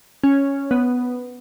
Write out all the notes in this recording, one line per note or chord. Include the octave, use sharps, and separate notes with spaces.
C#4
B3